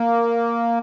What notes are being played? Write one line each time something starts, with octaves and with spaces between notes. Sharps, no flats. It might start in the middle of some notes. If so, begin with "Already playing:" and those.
Already playing: A#3